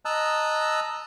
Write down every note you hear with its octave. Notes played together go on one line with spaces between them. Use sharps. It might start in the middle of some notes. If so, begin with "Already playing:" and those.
D#5 A5 A#5 E6 F#6